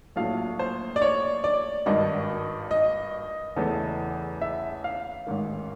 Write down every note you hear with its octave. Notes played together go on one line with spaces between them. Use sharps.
A#1 A2 F#3 A3 F5
C5
D5
C#5
D5
G#1 G2 D#3 D#5
D#5
E2 C#3 E3 A3
E5
F5
A1 G#2 D#3